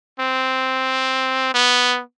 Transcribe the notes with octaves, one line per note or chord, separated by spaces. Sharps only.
C4
B3